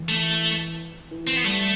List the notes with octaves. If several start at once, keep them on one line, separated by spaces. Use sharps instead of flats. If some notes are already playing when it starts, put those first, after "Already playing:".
Already playing: E3
A3
E3
C4
B3
G3 A3